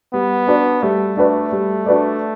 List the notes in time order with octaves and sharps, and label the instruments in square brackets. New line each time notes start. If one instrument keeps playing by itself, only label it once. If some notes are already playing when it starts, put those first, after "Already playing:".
[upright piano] G3 [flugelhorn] B3
[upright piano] D4 F#4 B4 D5
[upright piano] G3 [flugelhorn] A3
[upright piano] D4 F#4 B4 D5
G3
D4 F#4 B4 D5